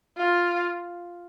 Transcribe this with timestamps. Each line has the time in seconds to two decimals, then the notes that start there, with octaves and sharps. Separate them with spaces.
0.17 F4